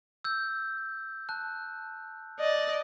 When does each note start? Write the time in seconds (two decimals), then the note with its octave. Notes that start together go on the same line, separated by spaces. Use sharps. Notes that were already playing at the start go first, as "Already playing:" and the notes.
0.24 E6 G6
1.29 A5 F#6
2.39 D5 D#5